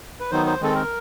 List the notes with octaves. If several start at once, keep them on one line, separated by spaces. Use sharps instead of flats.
B4
D#3 F#3 B3 D#4 C5
C5
D#3 G#3 C4 A4
A#4